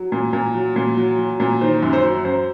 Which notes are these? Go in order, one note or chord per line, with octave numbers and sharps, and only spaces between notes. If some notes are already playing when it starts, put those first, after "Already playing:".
Already playing: F#3
A#2
A#2
F#3
A#2
F#3
F#3
A#2
D#3 C5
F#2
C5
F#3
F#2 C5